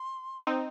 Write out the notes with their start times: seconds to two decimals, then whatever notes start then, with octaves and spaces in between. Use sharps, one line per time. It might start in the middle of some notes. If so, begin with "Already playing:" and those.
Already playing: C6
0.47 C4 D#4